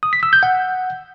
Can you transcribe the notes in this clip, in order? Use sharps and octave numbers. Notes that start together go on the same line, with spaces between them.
D#6
B6
E6
G6
F#5